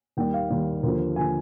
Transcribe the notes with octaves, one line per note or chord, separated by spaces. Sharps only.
D#2 D#3 G3 G5
F5
D#2 D#3 G3
D#2 D3 F3
D3 F3 G#5